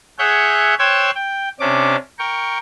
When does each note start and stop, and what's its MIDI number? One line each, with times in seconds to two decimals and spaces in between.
0.19 0.74 68
0.19 0.74 73
0.19 0.74 76
0.19 0.74 78
0.19 0.74 90
0.19 0.74 91
0.79 1.11 72
0.79 1.11 73
0.79 1.11 79
0.79 1.11 88
0.79 1.11 90
0.79 1.11 92
1.15 1.49 79
1.60 1.96 48
1.60 1.96 61
1.60 1.96 62
1.60 1.96 86
2.19 2.58 70
2.19 2.58 79
2.19 2.58 85